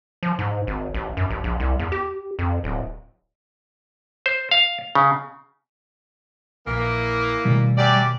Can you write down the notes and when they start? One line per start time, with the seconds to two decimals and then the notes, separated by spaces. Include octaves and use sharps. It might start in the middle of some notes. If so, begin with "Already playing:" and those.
0.23 F3
0.39 G#2
0.67 G#1
0.94 A1
1.17 F#2
1.30 A1
1.44 A#1
1.60 C2
1.79 E2
1.92 G4
2.39 F2
2.64 D1
4.26 C5
4.51 F5
4.95 C#3
6.67 A#1 E3 A#3
7.45 B2 D#3 G3 A3
7.77 F#2 G4 D5